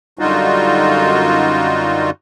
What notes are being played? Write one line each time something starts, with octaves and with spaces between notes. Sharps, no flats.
F#2 D3 G3 D#4 F4 F#4